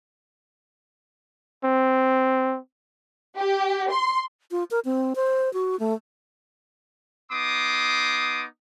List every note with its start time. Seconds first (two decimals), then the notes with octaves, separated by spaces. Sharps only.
1.64 C4
3.37 G4
3.91 C6
4.51 F4
4.71 A#4
4.85 C4
5.16 C5
5.54 F#4
5.80 A3
7.32 B3 D#4 C6 D6 D#6